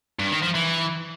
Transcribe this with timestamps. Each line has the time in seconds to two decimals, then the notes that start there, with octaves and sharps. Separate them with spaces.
0.19 G2
0.31 D#3
0.42 F3
0.54 E3